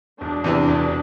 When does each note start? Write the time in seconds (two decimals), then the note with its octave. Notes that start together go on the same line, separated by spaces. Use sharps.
0.21 E1 D4
0.44 E2 C3 E3
0.68 E1